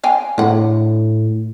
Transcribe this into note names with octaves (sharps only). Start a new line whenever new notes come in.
F5 G5 G#5
A2 D3 F#5